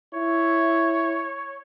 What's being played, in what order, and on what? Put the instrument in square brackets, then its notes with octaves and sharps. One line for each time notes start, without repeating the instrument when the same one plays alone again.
[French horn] E4 [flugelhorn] C#5